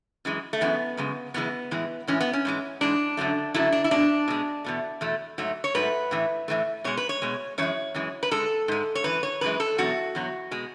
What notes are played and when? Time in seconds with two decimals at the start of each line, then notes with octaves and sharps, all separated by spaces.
0.25 F#2 E3 G#3
0.53 A3
0.61 F#2 E3 G#3 B3
0.97 F#2 C#3 G#3
1.34 F#2 C#3 E3 G#3 B3
1.71 A2 E3 G#3
2.07 A2 E3 G#3 C#4
2.21 B3
2.33 C#4
2.45 G#2 E3 G#3
2.81 G#2 E3 G#3 D4
3.17 F#2 D3 F#3 A3
3.54 F#2 D3 F#3 A3 E4
3.72 D4
3.84 E4
3.91 B2 G#3 D4
4.28 B2 G#3
4.64 E2 B2 A3
5.01 E2 B2 A3
5.38 G#2 F#3 A3
5.64 C#5
5.75 G#2 F#3 A3 B4
6.11 A2 E3 A3
6.48 A2 E3 A3
6.84 B2 G#3 C#5
6.97 B4
7.09 C#5
7.22 B2 G#3
7.58 F#2 E3 G#3 C#5
7.95 F#2 E3 G#3
8.23 B4
8.31 G#2 G#3 A4
8.68 G#2 G#3
8.95 C#5
9.04 F#2 E3 B4
9.23 C#5
9.41 F#2 E3 G#3 B4
9.60 A4
9.78 E2 B2 F#3 F#4
10.15 E2 B2 F#3
10.51 B2 G#3